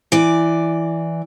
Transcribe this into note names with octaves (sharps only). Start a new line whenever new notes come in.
E3 D5